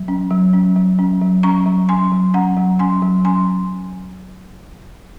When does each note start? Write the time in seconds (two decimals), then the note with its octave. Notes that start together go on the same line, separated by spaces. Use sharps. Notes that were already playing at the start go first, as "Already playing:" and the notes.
Already playing: F#3
0.08 C#4
0.31 F#3
0.53 C#4
0.76 F#3
0.99 C#4
1.21 F#3
1.43 C#4 A#5 C#6
1.66 F#3
1.89 C#4 G#5 C6
2.12 F#3
2.34 C#4 F#5 A#5
2.57 F#3
2.79 C#4 G#5 C6
3.02 F#3
3.25 C#4 G#5 C6